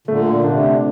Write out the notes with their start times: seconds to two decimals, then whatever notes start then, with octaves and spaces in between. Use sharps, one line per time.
0.07 A#2 D3 A3
0.44 C3 D4